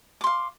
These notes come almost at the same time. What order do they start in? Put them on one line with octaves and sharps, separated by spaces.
D6 C6 F5